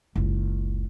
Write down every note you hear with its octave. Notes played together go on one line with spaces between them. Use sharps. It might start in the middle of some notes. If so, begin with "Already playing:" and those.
F#1 C#2